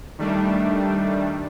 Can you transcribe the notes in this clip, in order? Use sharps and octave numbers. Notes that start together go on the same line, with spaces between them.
D#3 G3 A3 D4